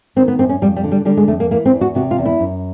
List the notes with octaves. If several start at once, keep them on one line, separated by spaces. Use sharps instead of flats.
D#3 C4
B3
F#2 C4
C#4
F2 G3
G3
D3
G3
D3 G3
G#3
F2 A3
A#3
E3 A#3
C4
E2
F#4
C3 F#4
F4
E2
E4
F#2